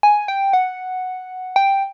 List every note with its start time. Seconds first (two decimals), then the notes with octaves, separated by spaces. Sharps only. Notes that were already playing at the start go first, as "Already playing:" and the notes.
0.03 G#5
0.28 G5
0.53 F#5
1.56 G5